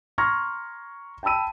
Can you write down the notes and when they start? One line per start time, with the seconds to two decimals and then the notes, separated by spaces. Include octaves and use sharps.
0.18 A#5 C6 C#6 F6 G#6 A#6
1.23 G5 A5 B5 E6 D#7